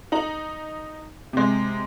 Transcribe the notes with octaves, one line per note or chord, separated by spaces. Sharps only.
D#4 A#5 F#7
C3 G#3